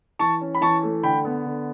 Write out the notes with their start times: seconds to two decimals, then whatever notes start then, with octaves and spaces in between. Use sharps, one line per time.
0.19 E3 A5 C#6
0.41 C#4
0.55 B5
0.61 E3 A5 C#6
0.83 A3
1.03 D3 G5 B5
1.25 B3
1.45 D3